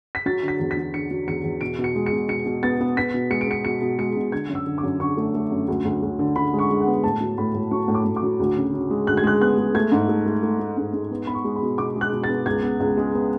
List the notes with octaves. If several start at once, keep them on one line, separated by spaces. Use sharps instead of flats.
B6
F#3 A6
D3
B6
E2
B6
F#3
D3 C#7
F#3
E2 C#7
E2
B2 D7
B2
C#7
G#3
C#7
B2
B2 C#7
B2
B3 A6
B3
B3 B6
B2
G#3 C#7
D7
B3 C#7
B2 C#7
B2
G#3 C#7
B2
D3 G#6
F#2
E6
D3
D6
F#2
D3 C#6
A3
A3
F#2
D2
D2
D2
D3
D3 B5
G#3
C#6
G#3
F#5
B3
A2 A5
F#3
A2 B5
A2
F#3 C#6
A2
D6
A2
D6
F#3
D2
C#3
C#3
G#3
D2 F#6
G#6
G#3 F#6
B3 F#6
G#3
A3 G#6
G#2
A3
A3
A3
A3
G#2
G#2
B3
B3 B5
C#6
G#3
B5
B2
B2 D6
G#3
F#6
B2
A6
B3
C#2 G#6
B3
C#2
G#3
B3